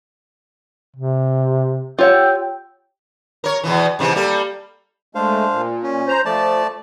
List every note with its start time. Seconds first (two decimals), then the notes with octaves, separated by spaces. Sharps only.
0.96 C3
1.99 F4 G4 C#5 F#5 G5 E6 G6
3.44 A#4 C#5
3.63 E2 B2 E3
3.99 G#2 C3 E3
4.15 G3 A#3 A4
5.15 G#3 A3 D4 C5 F5
5.52 A#2
5.83 C#4
6.08 C5 A#5
6.25 F3 A3 D5 A5